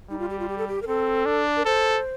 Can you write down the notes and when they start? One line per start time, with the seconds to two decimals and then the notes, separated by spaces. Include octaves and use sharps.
0.10 G3 D#4
0.19 F4
0.30 G4
0.40 F4
0.49 G4
0.58 A4
0.68 G4
0.82 A#4
0.88 C4 A4
1.25 D4
1.57 A#4
1.65 A4 C5